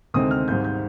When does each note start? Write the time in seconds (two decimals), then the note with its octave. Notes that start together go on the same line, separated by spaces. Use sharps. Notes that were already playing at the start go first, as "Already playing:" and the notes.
0.14 D2 C3 D#3 G#3 C4 D#6
0.31 F6
0.48 G#1 G#2 G3 G6
0.65 G6